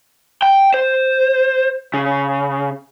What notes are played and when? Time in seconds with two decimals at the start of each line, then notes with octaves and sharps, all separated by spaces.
0.42 G5
0.74 C5
1.94 C#3